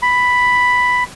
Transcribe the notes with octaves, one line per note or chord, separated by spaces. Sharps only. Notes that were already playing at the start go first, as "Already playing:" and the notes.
B5